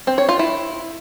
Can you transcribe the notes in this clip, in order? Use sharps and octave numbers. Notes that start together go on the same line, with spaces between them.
C4
C#5
F4
E4